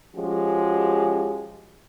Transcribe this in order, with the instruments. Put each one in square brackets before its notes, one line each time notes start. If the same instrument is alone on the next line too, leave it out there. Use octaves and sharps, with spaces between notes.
[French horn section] F3 G#3 C#4 F#4 G4